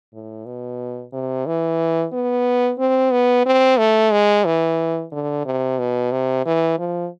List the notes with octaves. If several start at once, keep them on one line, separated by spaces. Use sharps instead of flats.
A2
B2
C3
E3
B3
C4
B3
C4
A3
G#3
E3
D3
C3
B2
C3
E3
F3